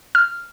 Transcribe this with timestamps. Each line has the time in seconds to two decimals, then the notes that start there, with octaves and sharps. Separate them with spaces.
0.15 F6